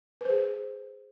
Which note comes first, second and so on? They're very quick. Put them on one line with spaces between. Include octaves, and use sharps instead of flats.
B4 C5 G#4